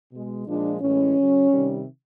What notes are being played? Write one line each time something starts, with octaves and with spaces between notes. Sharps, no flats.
B2 G#3
A#2 F3 G#3 D4
A2 E3 G#3 C#4
C#3 F#3
C3 D#3 G3